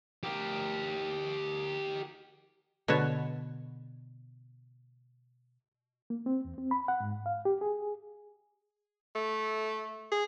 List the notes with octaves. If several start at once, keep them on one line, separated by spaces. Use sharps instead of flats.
G4 A#4
B2 D3 B4 C#5 A5
A#3
C4
E2
C4
B5
F#5
G#2
F5
G4
G#4
A3
G#4